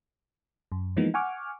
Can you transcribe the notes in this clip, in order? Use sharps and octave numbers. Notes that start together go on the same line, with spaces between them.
F#2
E3 F3 G#3 A#3 B3 D#4
F#5 G#5 C#6 D6 F6